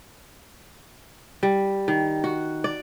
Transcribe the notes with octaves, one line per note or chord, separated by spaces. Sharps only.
G3
D#3
F#4
D5